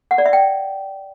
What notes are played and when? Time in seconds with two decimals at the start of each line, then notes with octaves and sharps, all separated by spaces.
0.11 F#5
0.18 D5
0.26 E5
0.33 G5